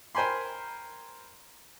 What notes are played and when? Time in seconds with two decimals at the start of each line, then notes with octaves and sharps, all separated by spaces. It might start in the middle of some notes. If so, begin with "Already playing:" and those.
0.15 A#4 C5 G5 G#5 B5 C6